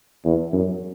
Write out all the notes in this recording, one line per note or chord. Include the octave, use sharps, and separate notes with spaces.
E2
F#2